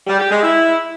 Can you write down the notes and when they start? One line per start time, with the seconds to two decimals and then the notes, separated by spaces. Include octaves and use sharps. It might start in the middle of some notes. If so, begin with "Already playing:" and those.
0.07 G3
0.19 G4
0.31 G#3
0.43 E4